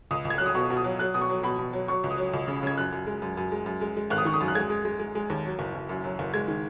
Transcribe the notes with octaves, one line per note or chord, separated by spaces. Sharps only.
C#2 D#6
C#2
G#6
F#3 F#6
D#6
B2 C#6
B2
D#6
F#3
F#3 F#6
B2 D#6
C#6
F#3
B2 B5
B2
F#3
F#3 C#6
C#2
D#6
F#3
C#2
C#3
C#3 G#6
F#2 F#6
F#2
G#3
F#2
F#2
G#3
F#2
G#3
G#3
G#1 F#6
D#6
D#3 C#6
D#6
F#2
F#6
G#3 G#6
G#3
G#3
G#3
G#3
D#2
F#3
F#1
F#1
F#2
F#3
F#1
G#3 G#6
D#3